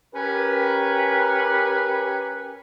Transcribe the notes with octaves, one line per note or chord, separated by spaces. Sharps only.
C#4 G4 A#4 B4